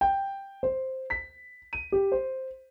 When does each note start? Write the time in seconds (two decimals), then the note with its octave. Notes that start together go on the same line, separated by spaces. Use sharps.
0.01 G5
0.63 C5
1.10 B6
1.73 D#7
1.92 G4
2.12 C5